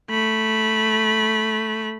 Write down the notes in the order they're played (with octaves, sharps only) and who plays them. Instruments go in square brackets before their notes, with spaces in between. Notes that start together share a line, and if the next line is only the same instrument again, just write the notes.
[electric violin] A3 B5